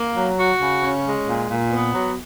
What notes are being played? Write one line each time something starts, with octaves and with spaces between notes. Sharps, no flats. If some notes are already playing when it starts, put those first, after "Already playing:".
Already playing: A#3
F#3
F#4
C#3
C#4
G#3
A#2
A#2
B3
F#3